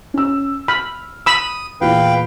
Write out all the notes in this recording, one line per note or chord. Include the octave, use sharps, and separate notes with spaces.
C#4 E6
B5 F6
B5 D#6 E6
E2 A#2 B4 F5 G5